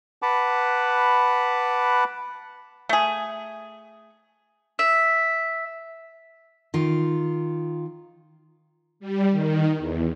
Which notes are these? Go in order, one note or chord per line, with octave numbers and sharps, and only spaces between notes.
B4 F#5 A5 B5 D6
A3 G#4
E5
D#3 F4
G3
D#3
E2